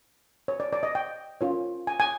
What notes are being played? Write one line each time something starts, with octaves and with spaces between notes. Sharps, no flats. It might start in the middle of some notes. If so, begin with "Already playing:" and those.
C#5
D5
D5
D#5
G5
C#4 F4 A#4 C#5
G#5
G#5